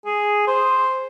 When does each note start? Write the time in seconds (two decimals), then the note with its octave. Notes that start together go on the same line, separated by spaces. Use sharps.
0.06 G#4
0.47 C5